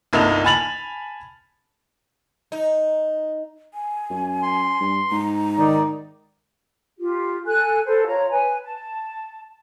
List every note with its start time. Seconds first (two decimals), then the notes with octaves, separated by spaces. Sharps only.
0.13 G1 C2 A#3 D#4 A5 F7
0.44 G#5 A5 B5 A6 F7 F#7
2.52 D#4
3.74 G#5
4.10 F#2
4.42 C6
4.81 G2
5.12 G#2 A#5
5.58 D#3 D#4 D5
6.98 F4 G4
7.46 A4 G#5 F#6
7.85 A4 B4 C5
8.05 F4 C#5 A#5
8.31 B4 G#5
8.63 A5